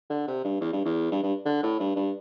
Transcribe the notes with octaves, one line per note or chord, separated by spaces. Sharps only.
D3
C3
G2
E2
G2
E2
G2
G2
D3
A2
G2
G2